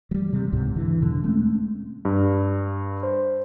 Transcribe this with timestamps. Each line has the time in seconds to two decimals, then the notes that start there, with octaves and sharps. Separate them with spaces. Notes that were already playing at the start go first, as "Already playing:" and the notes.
0.11 F#3 G3
0.33 C3 G3
0.52 C#2 G#2 C3
0.76 D3 E3
1.01 E2 B2 D3 G3
1.24 G#3 A3 C4 C#4
2.05 G2
3.03 C5